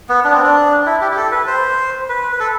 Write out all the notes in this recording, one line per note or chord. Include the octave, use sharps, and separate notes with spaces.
B3
D4
C4
D4
E4
G4
G4
A4
B4
C5
B4
B4
A4